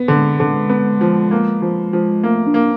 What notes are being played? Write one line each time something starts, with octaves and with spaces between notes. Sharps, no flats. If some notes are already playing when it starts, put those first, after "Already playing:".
Already playing: B3
D3
G#3
D3
B3
F3
A#3
F3
F3
A3 A#3
D4
A#3